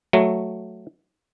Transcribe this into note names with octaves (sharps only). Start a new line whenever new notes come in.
F#3 A3